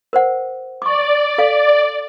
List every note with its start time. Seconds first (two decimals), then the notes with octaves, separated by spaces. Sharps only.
0.13 A#4 C5 F#5
0.82 D5 C#6 D6
1.38 A4 F5